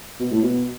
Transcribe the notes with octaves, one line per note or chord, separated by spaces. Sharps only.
B2
A2
B2